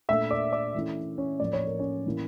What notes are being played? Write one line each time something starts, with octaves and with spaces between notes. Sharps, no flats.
A#2 A3 D4 E5 E6
D5 D6
D5 D6
E3 A3 C#4 E4
C#4 C#5
A2 F3 A#3 D5
C#5
A#4
C#4 C#5
A2 E3 A#3 E4